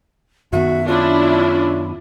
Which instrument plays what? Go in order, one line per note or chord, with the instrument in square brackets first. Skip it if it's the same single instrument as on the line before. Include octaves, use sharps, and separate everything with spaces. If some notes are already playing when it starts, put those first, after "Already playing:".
[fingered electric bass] F#2 D#3 B3 [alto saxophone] F#4 [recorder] E5
[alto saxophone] C#4 [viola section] D4 E4 [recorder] F4